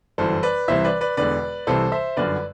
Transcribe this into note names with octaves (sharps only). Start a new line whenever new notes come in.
G1 F#2 E3 A4 C5
B4 D5
C2 C3 E3 C5 E5
B4 D5
B4 D5
E1 E2 D3 B4 D5
C2 C3 E3 A4 C5
C5 E5
G1 F#2 D3 B4 D5